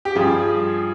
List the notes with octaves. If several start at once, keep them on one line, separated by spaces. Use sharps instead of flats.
G4
G2 F3 G#4